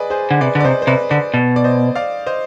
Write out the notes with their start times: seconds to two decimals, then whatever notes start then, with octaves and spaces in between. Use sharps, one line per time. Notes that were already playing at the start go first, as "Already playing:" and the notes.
Already playing: G#4 B4 D5 D#5
0.10 G#4 C5
0.31 D3
0.41 C3 B4 D5
0.55 D3
0.60 D5
0.64 C3 C5 D#5
0.82 C5
0.87 C3 B4 D5
1.10 D3 B4 D5
1.34 B2
1.56 D5
1.64 C5 D#5
1.95 D5 F5
2.26 C5 D#5